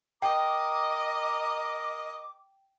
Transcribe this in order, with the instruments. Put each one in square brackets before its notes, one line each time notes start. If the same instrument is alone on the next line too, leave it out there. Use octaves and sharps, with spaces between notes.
[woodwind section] A#4 A#5 D6 [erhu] D#5 [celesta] G5